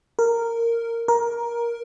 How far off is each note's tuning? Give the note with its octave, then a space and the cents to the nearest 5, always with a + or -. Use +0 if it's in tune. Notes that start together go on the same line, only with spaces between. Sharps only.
A#4 -10
A#4 +15